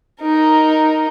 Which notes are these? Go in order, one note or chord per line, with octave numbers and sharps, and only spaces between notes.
D#4 A#4